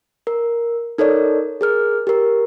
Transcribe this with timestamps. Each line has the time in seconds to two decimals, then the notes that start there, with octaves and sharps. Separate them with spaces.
0.27 A#4
0.98 D#4 A4 A#4 C#5 D5
1.61 G#4 A#4 F6
2.07 G4 A#4